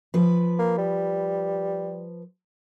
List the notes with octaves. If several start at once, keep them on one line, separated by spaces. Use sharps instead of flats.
F3 B4
A#3
G3